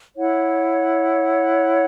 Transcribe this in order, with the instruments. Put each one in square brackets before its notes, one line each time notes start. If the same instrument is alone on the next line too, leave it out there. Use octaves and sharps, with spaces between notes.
[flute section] E4 C#5 F#5